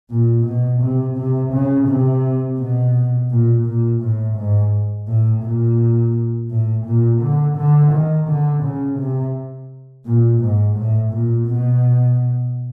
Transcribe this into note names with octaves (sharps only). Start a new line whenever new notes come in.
A#2
B2
C3
C3
C#3
C3
B2
A#2
A#2
A2
G#2
A2
A#2
A2
A#2
D3
D3
D#3
D3
C#3
C3
A#2
G#2
A2
A#2
B2